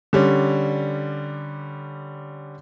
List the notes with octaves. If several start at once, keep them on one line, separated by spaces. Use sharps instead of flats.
D3 G3 C#4